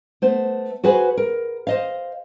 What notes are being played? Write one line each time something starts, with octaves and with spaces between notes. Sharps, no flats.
A3 B3 C5
F#4 G#4 B4 C5 G#5
A#4
C5 D#5 F5